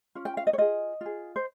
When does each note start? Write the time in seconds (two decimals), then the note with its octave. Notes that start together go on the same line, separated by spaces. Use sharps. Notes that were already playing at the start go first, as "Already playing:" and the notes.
0.15 C#4 F4
0.25 G5
0.37 F5
0.47 D#5
0.53 C#5
0.58 F4 G#4 D#5
1.01 F4 G#4
1.36 C5